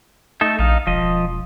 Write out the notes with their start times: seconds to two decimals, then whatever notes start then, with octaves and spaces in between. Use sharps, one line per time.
0.41 A3 D#4 A4
0.59 A#1 D#4 F5
0.87 E1 F3 D#5